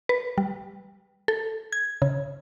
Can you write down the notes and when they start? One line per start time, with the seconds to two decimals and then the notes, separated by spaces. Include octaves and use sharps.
0.09 B4
0.38 G3
1.28 A4
1.72 G#6
2.02 C#3